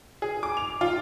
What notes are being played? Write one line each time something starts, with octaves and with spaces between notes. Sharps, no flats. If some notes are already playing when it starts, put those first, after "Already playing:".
G#4
D6
F7
F4